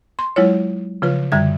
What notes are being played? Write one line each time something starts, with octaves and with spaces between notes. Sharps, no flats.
C6
F#3 G#3 E4 F4 C#5
C#3 F3 F4 B4
F#2 D3 G3 E5 G#6